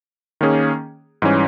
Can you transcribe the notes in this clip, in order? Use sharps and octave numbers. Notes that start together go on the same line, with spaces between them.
D#3 A#3 C#4 G#4
G#2 E3 G3 C#4